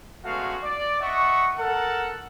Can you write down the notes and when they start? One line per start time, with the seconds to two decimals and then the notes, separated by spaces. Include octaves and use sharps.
0.24 G#3 A3 B3 C#4 F#4 F5
0.63 D5
1.00 D#5 E5 F#5 C#6
1.57 A4 A#4 F#5